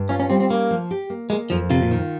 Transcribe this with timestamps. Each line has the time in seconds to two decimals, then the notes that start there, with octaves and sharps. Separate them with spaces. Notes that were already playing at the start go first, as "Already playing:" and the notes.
Already playing: G2
0.09 C#4 F4
0.20 C#4
0.30 G3 C4
0.40 C4
0.50 A#3 C#4
0.71 F3
0.91 G4
1.10 A#3
1.30 G#3 A#3
1.50 F2 F3
1.70 C3 F4
1.83 A#2
1.91 D#3